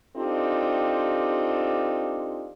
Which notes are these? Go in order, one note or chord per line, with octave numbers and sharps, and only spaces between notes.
C4 D4 D#4 F4 G4 A4